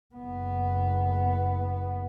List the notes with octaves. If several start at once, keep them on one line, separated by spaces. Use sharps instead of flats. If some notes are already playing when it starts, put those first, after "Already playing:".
F#1 B3